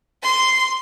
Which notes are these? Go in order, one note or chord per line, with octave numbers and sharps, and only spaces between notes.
C6